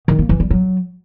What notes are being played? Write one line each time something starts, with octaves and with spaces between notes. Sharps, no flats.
D#3
A#3
E3
G3
F#3